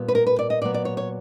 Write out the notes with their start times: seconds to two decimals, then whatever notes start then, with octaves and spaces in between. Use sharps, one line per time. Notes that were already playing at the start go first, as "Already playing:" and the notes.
Already playing: A#2 G3 B3
0.08 B4
0.15 A#4
0.27 B4
0.39 D5
0.50 D#5
0.62 A#2 F#3 B3 D5
0.74 D5
0.85 C#5
0.97 C#5